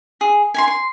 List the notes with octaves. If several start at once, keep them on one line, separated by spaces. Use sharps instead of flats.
G#4
G#5 B5 C6
C6